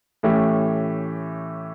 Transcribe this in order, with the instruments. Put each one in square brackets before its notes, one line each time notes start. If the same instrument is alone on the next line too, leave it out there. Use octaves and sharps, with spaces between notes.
[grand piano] A2 E3 A3 C#4 G4